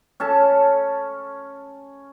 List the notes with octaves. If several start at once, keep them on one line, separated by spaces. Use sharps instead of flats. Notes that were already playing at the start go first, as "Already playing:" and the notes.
C#4 A4 A5